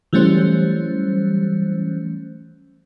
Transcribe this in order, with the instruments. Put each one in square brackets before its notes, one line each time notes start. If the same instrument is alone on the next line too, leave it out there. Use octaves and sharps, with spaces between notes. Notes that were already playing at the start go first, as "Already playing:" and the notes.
[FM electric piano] E3 F#3 G3 A3 C#4 C5